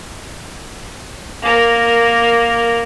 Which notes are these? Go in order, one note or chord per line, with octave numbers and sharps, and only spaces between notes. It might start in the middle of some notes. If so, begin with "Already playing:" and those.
A#3 A#4